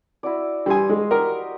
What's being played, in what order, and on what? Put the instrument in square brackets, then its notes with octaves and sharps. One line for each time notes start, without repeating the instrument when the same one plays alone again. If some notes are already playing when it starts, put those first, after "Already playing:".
[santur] E4 F#4 D5
[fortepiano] G3 G#5 [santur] B4 C5 D#6
[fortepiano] G#3
[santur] F#4 G4 D#5 [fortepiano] A#4